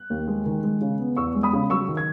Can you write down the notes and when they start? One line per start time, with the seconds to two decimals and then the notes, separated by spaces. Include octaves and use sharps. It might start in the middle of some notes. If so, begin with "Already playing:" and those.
Already playing: F#6
0.10 D#2
0.28 G#3
0.46 D#3
0.64 G#3
0.81 C#3
0.99 B3
1.17 E2 C#6 E6
1.35 G#3
1.43 B5 D#6
1.53 C#3
1.70 F#3 C#6 E6
1.89 D#3
1.97 G#6